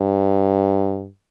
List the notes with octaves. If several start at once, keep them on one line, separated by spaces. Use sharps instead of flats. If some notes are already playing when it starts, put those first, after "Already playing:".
Already playing: G2